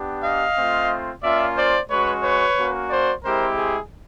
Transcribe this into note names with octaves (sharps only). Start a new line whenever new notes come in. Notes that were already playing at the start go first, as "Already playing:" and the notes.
Already playing: B3 D4 G4
D#5 F5
A3 C4 F4
A#3 C#4 F4 D5 E5
C5 D5
G#3 C#4 F#4 B4 C#5
B4 C#5
A#3 C#4 F#4
C5 D5
G#3 C4 E4 G4 A#4 C5
G#4